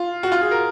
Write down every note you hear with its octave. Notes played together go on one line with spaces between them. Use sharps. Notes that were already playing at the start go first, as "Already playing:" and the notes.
Already playing: F4
F#4
F4
G#4
A#4